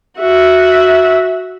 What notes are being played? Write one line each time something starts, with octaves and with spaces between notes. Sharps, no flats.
F#4 E5